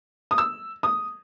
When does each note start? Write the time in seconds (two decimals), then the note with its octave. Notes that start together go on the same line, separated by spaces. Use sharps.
0.31 D#6
0.38 E6
0.83 D#6